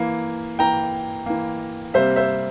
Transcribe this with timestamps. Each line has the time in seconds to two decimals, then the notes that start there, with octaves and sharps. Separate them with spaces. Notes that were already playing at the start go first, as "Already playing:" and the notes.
Already playing: E3 A#3
0.59 E3 A#3 G5 A#5
1.26 E3 A#3
1.94 C3 G3 A#3 C5 E5
2.16 C5 E5